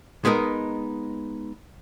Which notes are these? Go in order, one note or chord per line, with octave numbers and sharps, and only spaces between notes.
G#3 B3 D#4 A#4